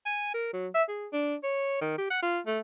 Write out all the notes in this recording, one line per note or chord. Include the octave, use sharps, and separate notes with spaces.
G#5
A#4
F#3
E5
G#4
D4
C#5
D#3
G4
F#5
F4
A3